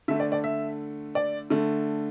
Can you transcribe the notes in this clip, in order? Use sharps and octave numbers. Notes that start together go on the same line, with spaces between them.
D3 A3 E5
D5
D5
E5
D5
D3 A3